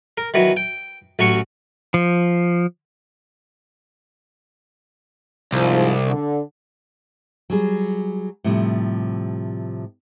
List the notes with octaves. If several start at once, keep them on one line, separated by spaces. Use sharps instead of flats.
A#4
D#3 E3 F#3 B3
G5
A1 F#3 C#4 F#4 C#6
F3
C2 G#2 F3
D3
F#3 G3 G#4
A2 C3 F3 G3